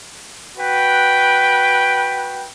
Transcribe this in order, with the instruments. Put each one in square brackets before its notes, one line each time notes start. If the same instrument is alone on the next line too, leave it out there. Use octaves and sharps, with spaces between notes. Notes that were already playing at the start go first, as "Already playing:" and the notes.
[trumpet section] F#4 B4 G5